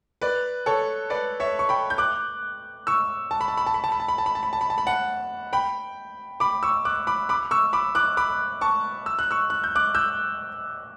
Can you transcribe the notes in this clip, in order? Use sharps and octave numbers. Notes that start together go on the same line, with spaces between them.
B4 D5
A4 C#5
B4 D5
C#5 E5
C#6
G5 B5
G6
D6 F#6
C#6 E6
A5
B5
A5
B5
A5
B5
A5
B5
A5
B5
A5
B5
A5
B5
A5
B5
A5
B5
F#5 A5
G5 B5
B5 D6
C#6 E6
D6 F#6
B5 D6
B5 D6
C#6 E6
B5 D6
D6 F#6
B5 D6
A5 C#6
E6
F#6
C#6 E6
F#6
G6
D6 F#6
E6 G6